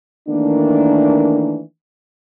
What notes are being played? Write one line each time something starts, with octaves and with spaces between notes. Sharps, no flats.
D#3 E3 A3 A#3 D4